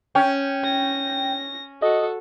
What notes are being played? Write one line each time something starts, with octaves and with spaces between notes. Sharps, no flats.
C#4 G5
A#6
F#4 A4 D#5